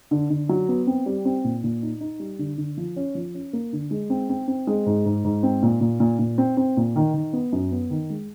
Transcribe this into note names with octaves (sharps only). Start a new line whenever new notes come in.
D3
D3
F#3
B3
C4
G3
C4
A#2
A#2
D#4
D#4
G3
D3
D3
F3
C#4
F3
C#4
A#3
D3
G#3
C4
C4
C4
G#3
G#2
G#2
G#2
C4
A#2
A#2
A#2
A#2
C4
C4
A#2
D#3
D#3
B3
F#2
B3
D#3
G#3